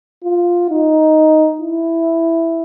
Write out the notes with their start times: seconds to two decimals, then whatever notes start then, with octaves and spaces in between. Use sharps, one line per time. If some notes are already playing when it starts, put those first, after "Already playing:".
0.24 F4
0.69 D#4
1.60 E4